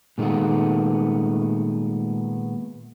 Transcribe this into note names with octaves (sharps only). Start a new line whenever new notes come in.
A#2 D#3 G#3 A3 B3